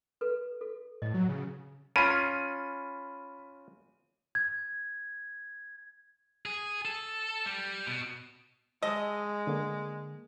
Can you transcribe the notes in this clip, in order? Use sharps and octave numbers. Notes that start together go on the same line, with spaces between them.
A4 B4
A4
A2 D#5
F#3
C#3
C#4 F4 B5 D#7
G#6
G#4
A4
G3
B2
G#3 D#5 A5 E6
D3 A#3